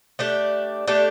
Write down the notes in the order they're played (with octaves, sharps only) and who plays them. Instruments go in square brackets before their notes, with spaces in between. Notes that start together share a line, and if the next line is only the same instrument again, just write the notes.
[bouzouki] A3 D4 G4
A3 D4 G4